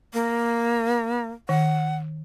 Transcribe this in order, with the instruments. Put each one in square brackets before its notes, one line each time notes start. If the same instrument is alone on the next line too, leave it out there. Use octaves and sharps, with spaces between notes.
[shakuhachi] A#3
[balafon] D#3 [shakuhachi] F#5